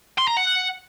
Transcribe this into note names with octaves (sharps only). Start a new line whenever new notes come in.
C6
A#5
F#5